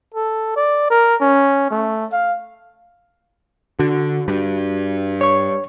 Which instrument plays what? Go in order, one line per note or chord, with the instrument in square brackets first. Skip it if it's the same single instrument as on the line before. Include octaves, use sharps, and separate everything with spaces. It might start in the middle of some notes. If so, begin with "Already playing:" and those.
[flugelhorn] A4
D5
A#4
C#4
A3
F5
[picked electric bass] D3 [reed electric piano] F#4
[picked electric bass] G2
[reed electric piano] C#5 C#6